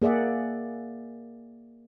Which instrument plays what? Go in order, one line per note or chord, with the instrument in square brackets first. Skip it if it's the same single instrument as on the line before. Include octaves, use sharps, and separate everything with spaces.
[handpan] A#3 G#4 D5 E5 F#5